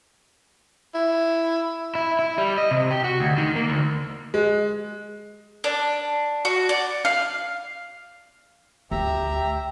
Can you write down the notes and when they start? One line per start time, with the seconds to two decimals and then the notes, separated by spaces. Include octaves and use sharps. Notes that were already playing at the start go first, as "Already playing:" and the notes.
0.94 E4
1.95 E4
2.19 E4
2.38 G3
2.58 D#5
2.71 C3
2.91 G4
3.04 F#4
3.20 D2
3.38 D#3
3.56 A#3
3.69 D2
4.34 G#3
5.64 D4
6.45 F#4
6.69 D5
7.05 F5
8.91 D2 G4 E5 A#5